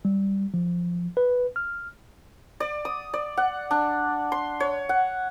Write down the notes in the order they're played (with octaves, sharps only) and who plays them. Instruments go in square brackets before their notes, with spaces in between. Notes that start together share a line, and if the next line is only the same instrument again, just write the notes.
[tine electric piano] G3
F3
B4
F6
[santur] D5
D#6
D5
F#5
D4
C6
C#5
F#5